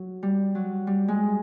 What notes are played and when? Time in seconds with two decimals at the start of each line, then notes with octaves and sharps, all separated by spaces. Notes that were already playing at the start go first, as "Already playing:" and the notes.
Already playing: F#3
0.23 G3
0.55 F#3
0.87 G3
1.08 G#3